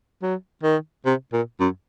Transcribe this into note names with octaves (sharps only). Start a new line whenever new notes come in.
F#3
D#3
C3
A#2
F#2